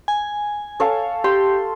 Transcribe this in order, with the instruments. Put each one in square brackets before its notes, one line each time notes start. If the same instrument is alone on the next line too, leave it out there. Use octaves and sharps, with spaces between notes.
[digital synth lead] G#5
[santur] A4 C#5 F5
[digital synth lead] G4 [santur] C6